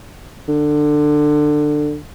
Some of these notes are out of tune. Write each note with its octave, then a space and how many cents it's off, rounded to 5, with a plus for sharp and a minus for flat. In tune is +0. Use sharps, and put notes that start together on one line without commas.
D3 +20